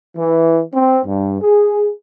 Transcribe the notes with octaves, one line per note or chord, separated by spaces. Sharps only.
E3
C4
G2
G#4